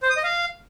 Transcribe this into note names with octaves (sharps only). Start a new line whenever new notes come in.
C5
D#6
D#5
F5